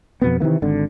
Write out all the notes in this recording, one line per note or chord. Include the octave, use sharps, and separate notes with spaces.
F2 B2 B3
C3 D#3 E3 A#3
G#1 D3